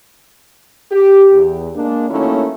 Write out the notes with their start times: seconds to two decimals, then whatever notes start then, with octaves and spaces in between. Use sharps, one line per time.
0.91 G4
1.33 E2
1.75 G#3 A#3 D4
2.09 D#3 F#3 A3 A#3 C#4 E4